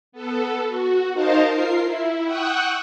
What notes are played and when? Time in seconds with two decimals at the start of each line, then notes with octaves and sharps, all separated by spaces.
0.12 B3 A4
0.67 F#4
1.13 D#4 A#4 C5 D#5 F5 A5
1.49 F4 A#4 C7
1.82 E4
2.24 F#5 G5 C#6 D#6 E6 F#6